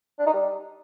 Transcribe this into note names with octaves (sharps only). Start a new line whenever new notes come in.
D4
D#4
G3